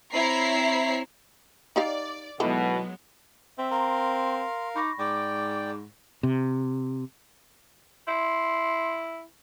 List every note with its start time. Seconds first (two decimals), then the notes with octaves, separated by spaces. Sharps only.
0.14 C4 E4 C#5 A#5 B6 C7
1.76 D#4 G4 D5 F5
2.40 B2 D#3 E3 F#3 G#3 B3 A4
3.58 C4 E5
3.71 A#4 F5 A#5 C6
4.76 D#4 B5 C#6 D6 A#6
4.99 G#2 D5 G5 D6
6.23 C3
8.08 E4 C6